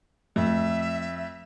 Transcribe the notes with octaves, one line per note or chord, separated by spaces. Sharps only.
F2 A3 E5